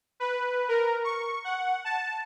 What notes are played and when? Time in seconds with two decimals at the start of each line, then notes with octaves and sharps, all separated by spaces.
0.20 B4
0.68 A#4
1.04 C#6
1.44 F#5
1.85 A5